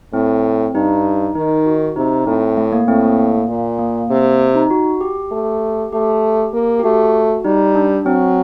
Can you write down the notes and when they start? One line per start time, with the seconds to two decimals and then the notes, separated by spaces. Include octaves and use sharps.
0.13 A2 C4
0.75 G2 D#4
1.35 D#3 D#4
1.66 F#4
1.96 C3 D#4
2.27 A2 C4
2.57 A3
2.72 A#3
2.88 A2 C4
3.03 A#3
3.48 A#2
3.79 A#3
4.10 C3
4.55 D#4
4.70 F#4
5.01 G4
5.32 A3
5.92 A3 G4
6.53 A#3
6.79 G4
6.83 A3 F#4
7.45 G3 D#4
7.75 D4
8.06 F#3 C4